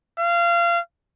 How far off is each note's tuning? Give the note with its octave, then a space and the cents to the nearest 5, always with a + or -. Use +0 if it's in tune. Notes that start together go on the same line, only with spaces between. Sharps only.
F5 -25